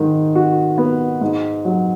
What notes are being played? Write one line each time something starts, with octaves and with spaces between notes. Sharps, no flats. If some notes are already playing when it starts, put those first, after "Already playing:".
Already playing: G#2 D#3
F#4
B3
G#2
F#3